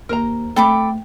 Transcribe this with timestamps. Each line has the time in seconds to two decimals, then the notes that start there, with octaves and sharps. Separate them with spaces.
0.09 D#2 A#4 C5 A#5
0.56 A3 C4 A4 B5 D6